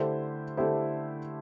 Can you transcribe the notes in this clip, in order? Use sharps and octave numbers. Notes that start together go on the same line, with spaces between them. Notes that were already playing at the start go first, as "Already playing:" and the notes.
Already playing: D3 A3 E4 G4 C5
D3 A3 E4 G4 C5